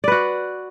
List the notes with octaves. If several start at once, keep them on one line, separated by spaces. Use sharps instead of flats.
F#4 B4 D5